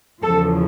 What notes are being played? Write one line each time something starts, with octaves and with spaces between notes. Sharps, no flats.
E2 C#3 F3 A4